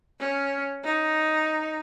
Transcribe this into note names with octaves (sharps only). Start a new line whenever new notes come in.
C#4
D#4